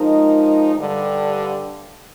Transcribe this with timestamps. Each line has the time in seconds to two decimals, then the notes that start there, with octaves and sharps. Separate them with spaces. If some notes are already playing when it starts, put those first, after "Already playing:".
Already playing: F3 G#3 D#4 A#4
0.76 G2 D3 G3